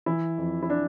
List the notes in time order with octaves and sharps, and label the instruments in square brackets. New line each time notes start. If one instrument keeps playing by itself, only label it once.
[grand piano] E3 E4
F2
E4
D4